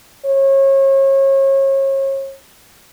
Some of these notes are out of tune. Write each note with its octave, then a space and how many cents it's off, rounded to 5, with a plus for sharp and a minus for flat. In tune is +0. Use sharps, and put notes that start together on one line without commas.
C#5 -35